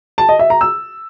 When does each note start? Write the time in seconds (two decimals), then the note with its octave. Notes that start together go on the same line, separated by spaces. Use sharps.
0.18 A5
0.29 D#5
0.39 E5
0.50 A#5
0.61 E6